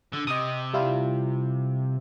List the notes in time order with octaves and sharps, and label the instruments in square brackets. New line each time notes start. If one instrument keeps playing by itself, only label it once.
[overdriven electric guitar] D3
[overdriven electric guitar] C3 [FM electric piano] D#5 D#6
[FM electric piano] G3 E4 F4